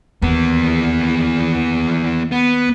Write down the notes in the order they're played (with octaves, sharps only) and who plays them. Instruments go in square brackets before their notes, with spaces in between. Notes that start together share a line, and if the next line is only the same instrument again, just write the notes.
[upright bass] D#2 [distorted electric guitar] E3 B3
[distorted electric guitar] B3